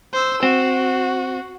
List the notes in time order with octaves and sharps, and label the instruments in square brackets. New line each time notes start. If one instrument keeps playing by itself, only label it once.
[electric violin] C5 E6
[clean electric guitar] C4 [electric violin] F#4